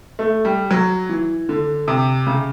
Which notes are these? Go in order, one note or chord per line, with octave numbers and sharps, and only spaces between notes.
A3
G3
F#3
E3
D3
C3
C#3